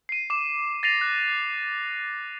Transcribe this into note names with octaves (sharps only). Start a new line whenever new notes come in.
C7 D#7
D6 E7
A6 A#6 C7 D#7 F7
F#6